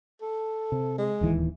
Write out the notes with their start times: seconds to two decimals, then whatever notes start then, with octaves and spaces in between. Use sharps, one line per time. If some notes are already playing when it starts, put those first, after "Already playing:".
0.22 A4
0.72 C3
0.99 G#3
1.21 D1 D#2 E3